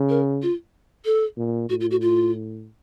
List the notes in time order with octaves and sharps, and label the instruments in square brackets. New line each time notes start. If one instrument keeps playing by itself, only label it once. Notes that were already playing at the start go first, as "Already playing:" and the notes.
Already playing: [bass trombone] C#3
[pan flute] A#4
F4
A4
[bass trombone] A#2
[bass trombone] A2 [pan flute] F#4
[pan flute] F4
F#4
F4